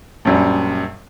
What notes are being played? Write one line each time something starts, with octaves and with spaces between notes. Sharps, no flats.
A#1 F#2 G3